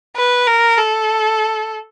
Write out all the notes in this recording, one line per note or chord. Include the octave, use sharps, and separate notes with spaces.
B4
A#4
A4